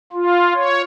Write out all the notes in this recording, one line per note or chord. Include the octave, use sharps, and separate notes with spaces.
F4
C#5